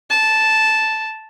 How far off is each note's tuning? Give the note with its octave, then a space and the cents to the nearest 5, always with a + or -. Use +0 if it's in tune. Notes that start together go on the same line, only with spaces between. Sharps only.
A5 -5